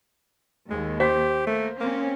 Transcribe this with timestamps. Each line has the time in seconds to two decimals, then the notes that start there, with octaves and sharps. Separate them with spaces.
0.70 D#2 G#3
1.00 G4 C5 B6
1.47 A3 A#3
1.80 A#3 C4 C#4